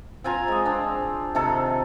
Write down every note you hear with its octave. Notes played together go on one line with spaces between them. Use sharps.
C4 F4 G#5 A#5
G#3 D#5
C4 D4
C3 D#3 A4 A#4